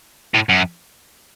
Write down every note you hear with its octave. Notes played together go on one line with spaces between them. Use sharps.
A2
F#2